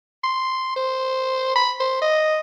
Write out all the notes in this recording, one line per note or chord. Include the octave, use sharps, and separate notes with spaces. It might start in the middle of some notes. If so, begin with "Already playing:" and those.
C6
C5
B5
C5
D#5